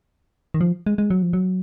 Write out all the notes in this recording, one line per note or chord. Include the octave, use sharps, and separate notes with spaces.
D#3
F3
G#3
G#3
F#3
F3
F#3